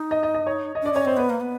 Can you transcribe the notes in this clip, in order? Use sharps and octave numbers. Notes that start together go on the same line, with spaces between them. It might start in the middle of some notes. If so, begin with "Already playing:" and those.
Already playing: D#4
D#5
D#5
D#5
C#5
D#5
D4 D5
C#4 C#5
C4 C5
B3 B4
A#3
B3